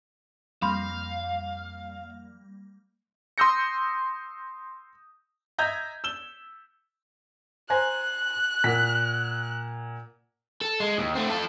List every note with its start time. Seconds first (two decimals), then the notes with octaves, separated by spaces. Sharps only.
0.62 F2 G3 A#3 F5 B5 C6 F6
3.38 C6 D#6 E6 G6 A#6 C#7
5.58 D#5 E5 A#5 G6 G#6
6.04 E6 E7 G7
7.70 C5 G#5 A#5 F#6
8.64 A#2 F#5 B6
10.61 A4
10.80 G#3
10.98 D#2
11.15 A3 C4
11.29 F4 A4